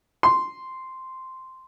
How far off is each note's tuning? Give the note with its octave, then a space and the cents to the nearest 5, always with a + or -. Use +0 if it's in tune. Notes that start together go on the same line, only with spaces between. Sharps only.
C6 -5